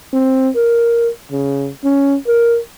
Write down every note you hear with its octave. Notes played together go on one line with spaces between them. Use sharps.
C4
A#4
C#3
C#4
A#4